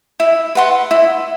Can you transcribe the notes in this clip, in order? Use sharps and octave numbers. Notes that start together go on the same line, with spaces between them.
E4
B4 F#5 C6
E4